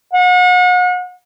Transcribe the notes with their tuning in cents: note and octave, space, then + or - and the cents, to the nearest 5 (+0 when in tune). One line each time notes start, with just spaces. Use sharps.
F#5 -40